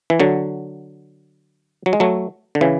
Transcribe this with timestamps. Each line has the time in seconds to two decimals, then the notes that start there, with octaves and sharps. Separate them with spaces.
0.10 E3
0.20 D3 F#3
1.86 F#3
1.93 G#3
2.00 F#3 A3
2.55 D3
2.61 C#3 E3